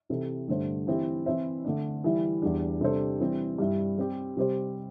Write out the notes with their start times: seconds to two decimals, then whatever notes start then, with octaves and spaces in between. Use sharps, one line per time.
0.09 C3 E3 C4 E4 A4
0.48 G2 D3 A3 D4 C5
0.87 E3 C4 E4 G4
1.26 E3 C4 E4 C5 E5
1.65 D3 A3 D4
2.04 E3 G3 E4
2.42 E2 E3 G3 D4
2.81 C3 G3 D4 A4 C5
3.20 E3 G3 C4
3.58 G2 G3 E4
3.98 G3 C4 G4
4.37 C3 G3 C4 G4 C5